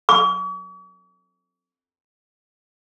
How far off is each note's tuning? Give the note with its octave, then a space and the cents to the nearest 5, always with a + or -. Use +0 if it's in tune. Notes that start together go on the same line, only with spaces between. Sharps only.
C#6 +45